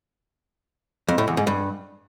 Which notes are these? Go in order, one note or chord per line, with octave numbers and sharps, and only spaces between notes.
F2
A2
E2
G#2
G2